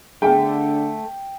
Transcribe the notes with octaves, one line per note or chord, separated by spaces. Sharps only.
D3 A3 B3 G#4 G5